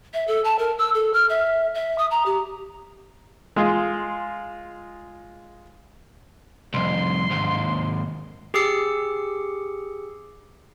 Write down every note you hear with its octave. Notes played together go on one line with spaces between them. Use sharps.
E5
A4
A5
A#4
E6
A4
F6
E5
E5
D#6
A#5
G4
G#3 F4 G#4
C2 F2 C6
D#2 G#2
G4 G#4 D6 E6 C7 C#7